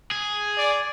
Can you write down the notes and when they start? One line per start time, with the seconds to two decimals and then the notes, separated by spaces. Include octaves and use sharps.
0.11 G#4
0.57 D5